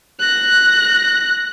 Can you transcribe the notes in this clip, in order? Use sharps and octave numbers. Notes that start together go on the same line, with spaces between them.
F#6 A#6